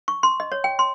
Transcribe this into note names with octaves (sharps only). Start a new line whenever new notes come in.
C#6
C6
D#5
C#5
G5
C6